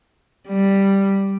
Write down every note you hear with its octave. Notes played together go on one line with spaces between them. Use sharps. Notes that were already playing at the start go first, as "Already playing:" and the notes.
G3